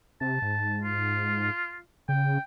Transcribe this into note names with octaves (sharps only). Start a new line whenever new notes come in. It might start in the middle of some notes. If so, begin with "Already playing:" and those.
C3 A5
G#2
F4
C#3 G5